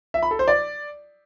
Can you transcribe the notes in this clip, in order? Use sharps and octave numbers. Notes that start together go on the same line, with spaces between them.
E5
B5
A4
C5
D5